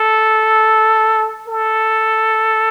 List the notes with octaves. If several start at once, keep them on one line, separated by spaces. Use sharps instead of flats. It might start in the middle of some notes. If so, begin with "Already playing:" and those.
Already playing: A4
A4